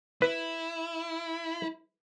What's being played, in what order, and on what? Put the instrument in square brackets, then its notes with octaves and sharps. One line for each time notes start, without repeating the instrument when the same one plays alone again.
[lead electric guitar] E4 [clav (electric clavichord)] B4